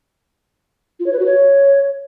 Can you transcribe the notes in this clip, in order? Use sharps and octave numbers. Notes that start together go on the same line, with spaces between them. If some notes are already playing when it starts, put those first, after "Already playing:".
F4
C#5
B4
F#4
C#5